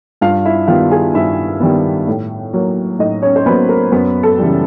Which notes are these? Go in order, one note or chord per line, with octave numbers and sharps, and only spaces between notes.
G2 F4 F5
E4 E5
D#3 G3 B3 F4 F5
G#4 G#5
G2 E4 E5
D#3 G3 B3
A2
F#3 A#3
A2 D#4 D#5
C#4 C#5
C5
F#3 A#3 B3 B4
A#4
F#2 B3 B4
A4
C#3 E3 G3